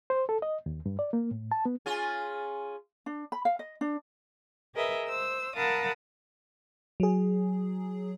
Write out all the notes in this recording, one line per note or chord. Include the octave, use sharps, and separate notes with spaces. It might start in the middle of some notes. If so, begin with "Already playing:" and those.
C5
A4
D#5
D#2
G2
D5
A#3
A2
A5
B3
C#4 F4 G#4
D4
B5
F5
D#5
D4
G#4 A#4 B4 D#5 E5
C5 E6
A#4 F5 F#5 A5 B5 D#6
F#3 G#4